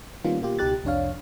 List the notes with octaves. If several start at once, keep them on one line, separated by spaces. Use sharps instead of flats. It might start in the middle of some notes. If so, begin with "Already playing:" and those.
D#3 G3 A#3 B3 C#4 F4
B2 A#3 F4 G4
C#2 B2 D#4 G4 F#6 A6
C2 F2 D4 C#5 F5